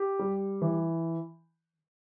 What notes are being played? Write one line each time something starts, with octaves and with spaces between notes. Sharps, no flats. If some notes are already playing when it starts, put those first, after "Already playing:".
Already playing: G4
G3
E3